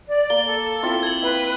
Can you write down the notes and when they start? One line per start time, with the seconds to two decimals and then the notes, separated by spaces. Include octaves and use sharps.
0.07 D5
0.30 A#3 G7
0.47 A4
0.83 C4 E4 F4
1.03 G#6 F#7
1.22 E4 B4 G5 C6